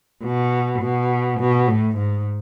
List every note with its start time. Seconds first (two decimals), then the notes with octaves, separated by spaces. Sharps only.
0.24 B2
0.81 B2
1.39 B2
1.68 A2
1.97 G#2